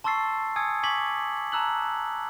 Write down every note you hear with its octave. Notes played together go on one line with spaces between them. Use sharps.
A5 C6 C#6 E6 A6 C7
G#5 D#6 E6 G#6 C#7
G#5 C#6 D6 G#6 B6 F#7
A5 A#5 E6 F#6 F#7